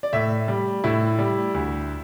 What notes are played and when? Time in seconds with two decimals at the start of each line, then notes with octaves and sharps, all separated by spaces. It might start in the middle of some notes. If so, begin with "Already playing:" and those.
0.03 D5
0.13 A2 E5
0.48 G3
0.84 A2 E4
1.18 G3
1.54 D2